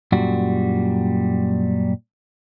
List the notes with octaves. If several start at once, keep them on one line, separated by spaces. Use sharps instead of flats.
F#2 A#2 G3 F#4